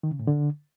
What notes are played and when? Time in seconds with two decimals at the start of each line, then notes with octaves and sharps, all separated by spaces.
0.03 D#3
0.11 C#3
0.19 A2
0.27 D3